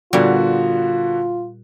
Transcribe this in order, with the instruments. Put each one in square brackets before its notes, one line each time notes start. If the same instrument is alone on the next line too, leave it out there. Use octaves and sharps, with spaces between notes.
[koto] A#2 G3 [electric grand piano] D3 B3 F#4 [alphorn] F4